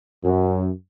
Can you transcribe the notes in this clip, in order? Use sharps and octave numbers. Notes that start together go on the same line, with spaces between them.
F#2